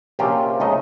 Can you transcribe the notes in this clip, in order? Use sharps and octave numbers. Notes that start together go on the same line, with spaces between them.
A#1 C3 C4 C#4 F4 G4
C#2 A3 D#4 D#5